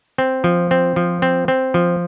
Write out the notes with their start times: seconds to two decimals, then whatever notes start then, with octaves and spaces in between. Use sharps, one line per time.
0.18 C4
0.44 F3
0.71 C4
0.96 F3
1.22 C4
1.48 C4
1.74 F3